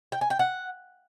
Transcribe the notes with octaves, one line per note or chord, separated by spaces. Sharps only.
G5
G#5
G5
F#5